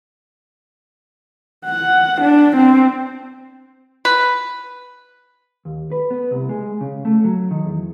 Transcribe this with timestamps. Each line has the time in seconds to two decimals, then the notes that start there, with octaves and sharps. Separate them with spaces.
1.66 F#5
2.21 D4
2.56 C4
4.05 B4
5.65 D#2
5.92 B4
6.10 B3
6.31 C2
6.49 G#3
6.81 C#3
7.05 A3
7.25 F#3
7.51 D#3
7.66 E2